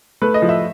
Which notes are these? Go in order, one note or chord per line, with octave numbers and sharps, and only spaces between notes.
A3 B4
D#5
F3
E5